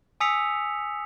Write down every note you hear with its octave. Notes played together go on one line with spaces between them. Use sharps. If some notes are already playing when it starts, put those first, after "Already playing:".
G#5 D#6 E6 B6 C#7 F7